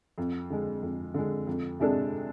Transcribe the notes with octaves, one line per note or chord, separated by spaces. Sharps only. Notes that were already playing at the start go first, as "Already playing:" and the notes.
F2
D3 G#3
F2
D3 G#3
F2
C3 G#3 D4 A4